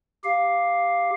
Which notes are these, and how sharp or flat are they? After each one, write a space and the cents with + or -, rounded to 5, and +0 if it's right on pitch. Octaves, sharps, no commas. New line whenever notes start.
G4 +0 F5 +0